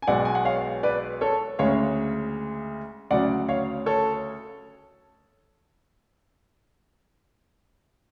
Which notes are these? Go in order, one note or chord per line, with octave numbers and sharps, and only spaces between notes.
G#5
B1 B2 G#3 D5 F#5
G#5
F#5
C#5 F5
B4 D5
A4 C#5
D2 C#3 G#3 C#5 F5
D2 C#3 F#3 D5 F#5
C#5 F5
A4 C#5